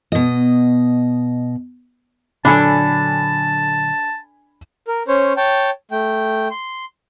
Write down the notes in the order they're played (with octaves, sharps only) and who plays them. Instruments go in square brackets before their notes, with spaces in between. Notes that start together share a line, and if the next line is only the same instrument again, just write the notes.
[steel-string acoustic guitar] B2 D#5
[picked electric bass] A#2 D3 F#3 [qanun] D4 A4 [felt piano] G#5 B5 [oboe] A5
[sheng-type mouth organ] A#4
C#4 C5 C#5
C#5 G5 A5
A3 G5
C6